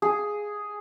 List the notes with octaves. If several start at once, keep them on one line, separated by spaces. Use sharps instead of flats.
G#4